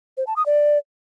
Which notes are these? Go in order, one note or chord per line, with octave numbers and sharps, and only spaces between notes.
C5
A5
D#6
D5